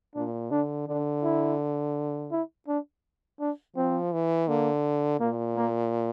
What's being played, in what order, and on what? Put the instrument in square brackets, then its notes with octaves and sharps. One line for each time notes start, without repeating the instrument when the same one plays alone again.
[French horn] A#2 [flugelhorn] D4
[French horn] D3 [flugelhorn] D4
[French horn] D3 [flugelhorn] D4
[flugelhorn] E4
E4
D4
D4
[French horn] F3 [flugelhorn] C4
[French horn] E3
[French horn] D3 [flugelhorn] A#3
[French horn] A#2 [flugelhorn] A#3
[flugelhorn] A#3